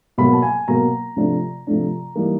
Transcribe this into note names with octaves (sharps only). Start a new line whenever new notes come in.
B2 F#3 A#3 B5
A5
G#5
B2 F#3 A#3 A#5
C3 F3 A3 D4
C3 F3 A3 D4
E3 G3 A#3 D#4